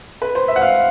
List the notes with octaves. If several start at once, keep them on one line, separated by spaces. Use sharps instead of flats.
B4
C5
E5
F#5
F5